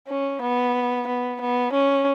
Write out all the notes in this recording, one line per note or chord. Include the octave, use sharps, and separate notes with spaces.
C#4
B3
B3
B3
C#4